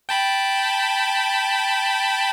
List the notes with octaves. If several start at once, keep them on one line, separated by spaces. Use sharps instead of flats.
G5 A5 B5